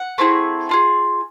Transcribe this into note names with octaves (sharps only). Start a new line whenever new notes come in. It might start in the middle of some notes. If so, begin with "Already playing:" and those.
Already playing: F#5
A3 C4 E4 G#4
D4 F4 G#4